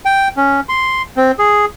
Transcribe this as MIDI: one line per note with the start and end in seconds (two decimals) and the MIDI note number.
0.05 0.28 79
0.37 0.60 61
0.69 1.02 84
1.17 1.32 60
1.39 1.65 68